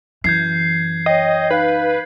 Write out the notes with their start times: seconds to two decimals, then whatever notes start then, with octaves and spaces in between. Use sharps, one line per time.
0.24 F#2 E3 G6 G#6 C7
1.06 C#5 D#5 G5
1.50 D#4 B4 F5